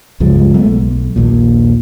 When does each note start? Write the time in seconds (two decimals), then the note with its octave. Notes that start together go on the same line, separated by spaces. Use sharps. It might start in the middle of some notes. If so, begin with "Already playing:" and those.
0.20 C#2 G2 F3 G#3
0.54 F#3 G#3 A3 B3
0.66 B1
1.16 A#1 D#2 A#2